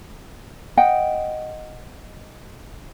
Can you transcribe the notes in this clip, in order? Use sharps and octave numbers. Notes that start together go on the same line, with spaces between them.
D#5 F#5 G5